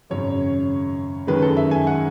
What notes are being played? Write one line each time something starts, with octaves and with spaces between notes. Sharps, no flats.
G#1 F#2 C#3 C#5
F#2 D#3 G#3 B4
A4
E5
G#5
F#5